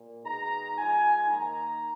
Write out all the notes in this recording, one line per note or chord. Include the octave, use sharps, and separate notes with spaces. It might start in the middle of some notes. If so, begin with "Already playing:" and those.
Already playing: A#2
B2 G#3 D#4 A#5
F3 G#3 D#4 G#5
D#3 A#3 D#4 A#5